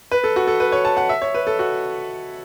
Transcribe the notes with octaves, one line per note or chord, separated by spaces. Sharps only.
B4
A4
F#4
A4
B4
C#5
A5
F#5
E5
C#5
B4
A4
F#4